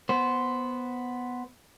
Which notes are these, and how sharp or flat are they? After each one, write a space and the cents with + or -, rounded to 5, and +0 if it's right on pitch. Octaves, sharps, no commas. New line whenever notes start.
B3 +0 C5 -5